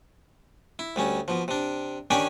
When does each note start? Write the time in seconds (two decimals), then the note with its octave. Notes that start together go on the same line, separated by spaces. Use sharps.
0.79 E4
0.96 D2 G3 C#4
1.28 B2 F3
1.48 C3 D4
2.11 D#3 C#4 D4 G4 D5 G#5